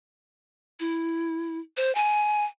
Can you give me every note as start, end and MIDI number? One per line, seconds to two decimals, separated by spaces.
0.80 1.59 64
1.77 1.94 72
1.95 2.45 80